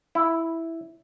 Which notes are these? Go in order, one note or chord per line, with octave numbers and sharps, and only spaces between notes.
E4